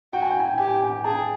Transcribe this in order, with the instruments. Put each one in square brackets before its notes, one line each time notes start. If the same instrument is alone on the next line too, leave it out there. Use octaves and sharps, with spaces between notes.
[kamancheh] F#4 [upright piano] G5
[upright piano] G#5
G5
G#5
G5
[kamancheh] G4 [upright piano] G#5
[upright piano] G5
G#5
G5
[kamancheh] G#4 [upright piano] A5